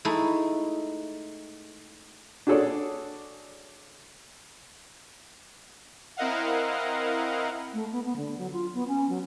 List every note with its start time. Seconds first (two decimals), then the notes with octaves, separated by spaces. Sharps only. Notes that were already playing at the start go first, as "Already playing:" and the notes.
0.05 G#3 A3 D#4 E4
2.47 D4 F#4 G#4 A4 C#5 D5
6.17 C4 E4 A#4 D#5 F5 F#5
7.73 A3
7.92 B3
8.05 B3
8.16 D3
8.38 F#3
8.52 F4
8.74 B3
8.88 C#4
9.09 F#3